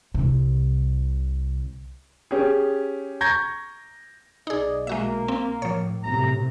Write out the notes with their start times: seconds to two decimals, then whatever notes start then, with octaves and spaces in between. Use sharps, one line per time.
0.14 C2 C3
2.31 C#4 G4 G#4
3.21 A#5 C#6 G6 G#6 A#6
4.47 B1 D#4 G#4 D5 D#5
4.87 G#3 A#3 F#4 E5
5.28 C4
5.62 A2 F3 C#5
6.03 B1 F#2 A2 C3 A#5